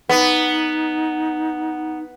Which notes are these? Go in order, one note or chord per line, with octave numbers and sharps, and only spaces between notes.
B3 D#4